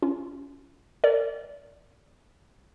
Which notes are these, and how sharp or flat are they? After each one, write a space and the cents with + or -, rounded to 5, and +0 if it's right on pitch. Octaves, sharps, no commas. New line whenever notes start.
C#4 +15 F4 -30
A#4 -30 D5 -25